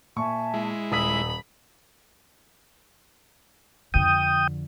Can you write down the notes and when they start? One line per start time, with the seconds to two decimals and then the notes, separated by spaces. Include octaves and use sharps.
0.16 A#2 E5 G#5 A5 C#6
0.54 G#3 E4
0.92 D#1 B5 D#6 E6 B6
3.94 F2 D3 G5 D#6